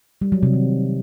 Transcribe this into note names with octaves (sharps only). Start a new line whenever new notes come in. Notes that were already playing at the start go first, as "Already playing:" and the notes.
G3
F#3
C3
D#3